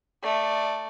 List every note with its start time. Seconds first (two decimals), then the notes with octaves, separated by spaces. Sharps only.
0.22 A3 D5